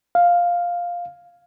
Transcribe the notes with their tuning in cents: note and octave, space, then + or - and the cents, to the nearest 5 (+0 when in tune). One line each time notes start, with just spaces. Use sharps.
F5 +5